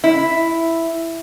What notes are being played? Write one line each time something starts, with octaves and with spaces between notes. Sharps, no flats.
E4